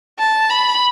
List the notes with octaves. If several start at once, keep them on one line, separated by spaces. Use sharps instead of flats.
A5
B5